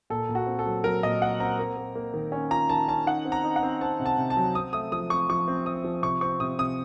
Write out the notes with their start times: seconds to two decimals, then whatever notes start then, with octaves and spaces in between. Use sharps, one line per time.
0.10 A#2 A4
0.29 A#2
0.35 F#4
0.46 C4
0.59 A4
0.66 F#3
0.84 F#3 A#4
1.03 A#2 D#5
1.21 C4 F#5
1.40 C4 A#5
1.59 A#3
1.77 A#3
1.95 A#3
2.14 D#3
2.32 C#4
2.50 F4 A#5
2.69 D#3 A5
2.88 C#4 A5
3.06 D#4 F#5
3.25 C4
3.32 A#5
3.44 D#4
3.56 F#5
3.63 C4
3.81 C4 A5
4.00 C3
4.06 A5
4.17 C3
4.30 A5
4.37 F#3
4.55 C4 D#6
4.73 A3 D#6
4.92 F3 D#6
5.10 C4 C#6
5.29 F3 C#6
5.48 C4
5.66 C4 D#6
5.85 F3
6.03 C3 C#6
6.21 C4 C#6
6.40 C3 D#6
6.59 C3 D#6